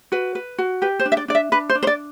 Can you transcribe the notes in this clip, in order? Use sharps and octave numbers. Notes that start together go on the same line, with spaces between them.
F#4 B4
B4
F#4
G4 B4
C5
D4
E5
D5
D4 D5
E5
D4 B4
C5
D4
C5
D5